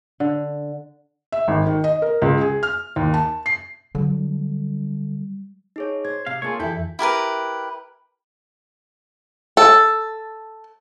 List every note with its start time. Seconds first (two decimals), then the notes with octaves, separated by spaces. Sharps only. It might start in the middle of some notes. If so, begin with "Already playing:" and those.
0.20 D3
1.32 E5
1.48 G#1
1.67 D#3
1.84 D#5
2.02 A#4
2.22 C#2
2.41 G#4
2.63 F6
2.96 D#2
3.14 A5
3.46 C7
3.95 D3 F#3 G3
5.76 D#4 G#4 C#5
6.05 C5 G#6
6.26 C3 F5
6.42 A#3 F4 G#4 A4 C#5
6.60 F2 E3 E4 G4 A4
6.99 E4 G4 A#4 B4
9.57 A4